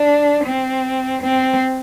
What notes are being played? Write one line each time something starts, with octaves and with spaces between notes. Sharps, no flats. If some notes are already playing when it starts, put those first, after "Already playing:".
Already playing: D4
C4
C4